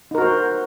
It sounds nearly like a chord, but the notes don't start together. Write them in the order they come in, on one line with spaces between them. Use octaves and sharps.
D#4 A#4 F#4 C5